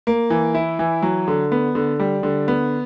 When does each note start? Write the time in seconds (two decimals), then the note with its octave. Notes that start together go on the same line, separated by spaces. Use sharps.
0.07 A#3
0.30 E3
0.54 E4
0.79 E3
1.02 F#3
1.28 D3
1.52 B3
1.75 D3
2.00 G3
2.23 D3
2.48 B3